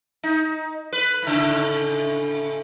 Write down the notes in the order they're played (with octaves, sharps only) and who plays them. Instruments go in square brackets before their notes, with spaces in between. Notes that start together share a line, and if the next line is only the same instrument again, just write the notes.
[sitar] D#4
B4
A2 C#3